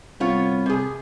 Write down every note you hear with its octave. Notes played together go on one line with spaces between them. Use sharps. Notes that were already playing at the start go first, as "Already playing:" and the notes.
C2 B3 F4 C#5
C3 G#4